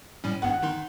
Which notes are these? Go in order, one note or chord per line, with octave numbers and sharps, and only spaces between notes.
A2 G3 C#4
G1 G2 B3 F#5
D#3 D#4 C6